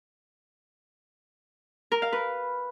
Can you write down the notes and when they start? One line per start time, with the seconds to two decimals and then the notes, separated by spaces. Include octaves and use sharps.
1.92 A#4
2.02 F5
2.12 B4